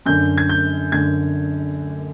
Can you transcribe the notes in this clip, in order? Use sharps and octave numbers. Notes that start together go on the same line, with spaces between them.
F#2 D3 G6
G#6
G6
F#2 D3 G#6